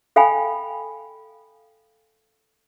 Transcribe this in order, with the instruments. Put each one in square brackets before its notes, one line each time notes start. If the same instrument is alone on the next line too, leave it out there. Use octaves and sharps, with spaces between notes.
[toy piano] A4 F5 G5 G#5 B5